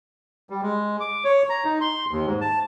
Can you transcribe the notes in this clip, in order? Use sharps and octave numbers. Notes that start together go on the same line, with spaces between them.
G3
G#3
D6
C#5
A#5
D#4
C6
D#2
G#2
A5